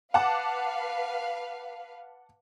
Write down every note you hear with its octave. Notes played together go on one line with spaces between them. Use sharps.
B4 F5 F#5 A5 D6